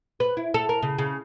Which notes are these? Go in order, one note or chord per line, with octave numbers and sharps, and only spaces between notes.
B4
E4
A4
A#4
C#3
C#3